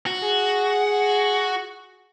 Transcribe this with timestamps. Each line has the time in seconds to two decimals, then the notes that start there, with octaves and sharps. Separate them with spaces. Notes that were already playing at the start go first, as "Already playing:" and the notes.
0.06 F#4
0.23 G#4